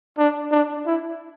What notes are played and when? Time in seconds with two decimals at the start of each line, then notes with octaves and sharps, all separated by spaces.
0.18 D4
0.51 D4
0.86 E4